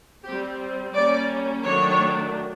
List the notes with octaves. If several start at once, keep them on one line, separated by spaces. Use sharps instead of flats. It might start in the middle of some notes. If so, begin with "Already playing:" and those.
G3 C4 G4
G3 A#3 C#4 D5
D#3 F#3 A3 D4 C#5